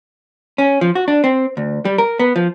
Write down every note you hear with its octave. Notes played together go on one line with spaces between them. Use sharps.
C#4
F3
F#4
D4
C4
D2
G3
A#4
B3
F3